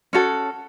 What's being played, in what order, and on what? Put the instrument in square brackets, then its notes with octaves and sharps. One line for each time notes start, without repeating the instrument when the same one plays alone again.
[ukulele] C#4 F#4 A4